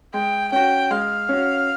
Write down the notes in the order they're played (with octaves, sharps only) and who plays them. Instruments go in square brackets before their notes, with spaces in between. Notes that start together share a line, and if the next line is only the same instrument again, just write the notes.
[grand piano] G#3 [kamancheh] G5
[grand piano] C#4 F#4 [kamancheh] G5
[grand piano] G#3 [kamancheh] F5
[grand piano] C#4 F#4